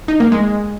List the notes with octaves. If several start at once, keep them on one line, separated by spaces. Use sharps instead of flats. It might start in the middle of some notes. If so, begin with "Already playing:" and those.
D#4
A#3
G#3